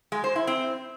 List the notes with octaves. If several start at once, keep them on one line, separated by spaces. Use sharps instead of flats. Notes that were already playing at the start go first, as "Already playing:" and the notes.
G#3
C5
E4
C4